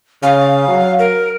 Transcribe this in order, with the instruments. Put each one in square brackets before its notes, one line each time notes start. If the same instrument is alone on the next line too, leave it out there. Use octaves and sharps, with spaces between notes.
[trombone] C#3 [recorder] F5
[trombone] F#3
[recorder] A#4